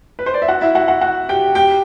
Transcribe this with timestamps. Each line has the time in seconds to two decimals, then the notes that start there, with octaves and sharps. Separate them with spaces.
0.19 B4
0.26 C5
0.34 D5
0.42 E5
0.48 F#4 F#5
0.61 E4 E5
0.75 F#4 F#5
0.88 F#4 F#5
1.01 F#4 F#5
1.29 G4 G5
1.55 G4 G5